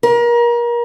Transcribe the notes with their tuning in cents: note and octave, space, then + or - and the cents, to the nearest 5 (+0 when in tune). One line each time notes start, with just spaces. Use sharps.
A#4 +30